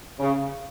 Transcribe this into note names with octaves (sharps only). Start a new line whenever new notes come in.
C#3